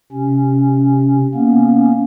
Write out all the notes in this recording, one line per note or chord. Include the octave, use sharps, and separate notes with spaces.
C3 C#4
A#3 B3 C#4